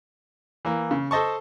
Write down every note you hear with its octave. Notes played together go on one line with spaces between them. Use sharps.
E3 A#3
C#3
A4 C5 D#5 A5 C#6